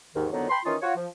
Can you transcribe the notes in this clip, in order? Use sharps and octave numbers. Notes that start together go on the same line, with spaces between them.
D#2 G#2 D#3
F2 D3 D#3 F#3 B3 D#4
G5 A5 B5 C6
D#3 E3 C#4 D#4 F4
F4 F#4 C#5
F3